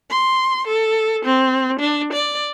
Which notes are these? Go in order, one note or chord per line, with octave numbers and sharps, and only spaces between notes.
C6
A4
C4
D4
D5